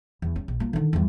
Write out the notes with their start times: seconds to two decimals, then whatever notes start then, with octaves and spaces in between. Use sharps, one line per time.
0.22 E2
0.36 C#4
0.48 A#1
0.60 A#3 F4
0.73 D3 D#3
0.93 E2 G2